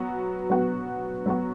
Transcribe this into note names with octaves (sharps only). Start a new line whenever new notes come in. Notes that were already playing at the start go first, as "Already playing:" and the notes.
Already playing: F#3 B3 F#4
F#3 B3 F#4
F#3 B3 F#4